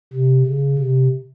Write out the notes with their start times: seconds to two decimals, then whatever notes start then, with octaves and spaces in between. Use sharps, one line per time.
0.13 C3
0.46 C#3
0.78 C3